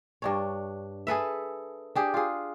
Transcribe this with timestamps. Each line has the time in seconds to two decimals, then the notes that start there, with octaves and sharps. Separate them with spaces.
0.22 G2 D4 C#5
1.07 G#4 A4 B4 E5
1.95 D4 G4 G#4
2.14 F4 G#4